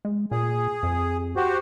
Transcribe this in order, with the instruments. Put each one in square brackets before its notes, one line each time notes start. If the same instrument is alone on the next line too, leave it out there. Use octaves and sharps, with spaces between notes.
[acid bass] G#3
[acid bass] A#2 [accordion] G#4
[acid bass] F2
[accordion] F#4 G4 C5